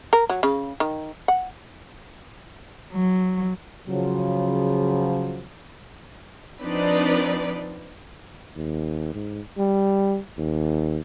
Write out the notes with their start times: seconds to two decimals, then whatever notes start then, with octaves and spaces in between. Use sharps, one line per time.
0.13 A#4
0.30 F#3
0.43 C#3
0.80 D#3
1.28 F#5
2.92 F#3
3.88 C#3 F3 F#3
6.61 F3 C4 D4 D#4 B4 D5
8.56 D#2
9.14 G#2
9.58 G3
10.38 D#2